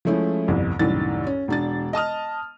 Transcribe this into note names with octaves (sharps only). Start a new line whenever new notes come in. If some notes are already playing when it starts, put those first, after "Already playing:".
F3 G#3 A3 C#4 E4
G1 C2 F2
C2 F#2 A2 D#3 A6
C#4
E1 D4 A6
D#5 A5 D#6 F6